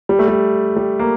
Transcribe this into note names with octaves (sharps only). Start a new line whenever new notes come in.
G3
A3
G3
G3
A#3